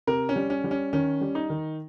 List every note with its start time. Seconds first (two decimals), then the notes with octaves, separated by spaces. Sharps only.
0.07 C3 A#4
0.29 C#4
0.36 G3
0.50 C#4
0.64 G3
0.71 C#4
0.93 D#3 C#4
1.21 G3
1.35 D#4
1.50 D#3